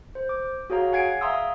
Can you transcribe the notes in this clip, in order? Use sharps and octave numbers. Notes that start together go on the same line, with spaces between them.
C5
D6
F#4 G#4 C#5 F5 A#5
G#4 F#5 G#5 G#6 C7 D7
E5 F5 A#5 C6 D#6 E6